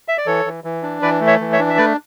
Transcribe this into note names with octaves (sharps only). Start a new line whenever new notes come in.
E5
D5
E3 A4 C#5
E3
E3
D4
E3 B4 D5
A3
C#5 E5
E3
C#5 E5
D4
E5
A3 B4 D5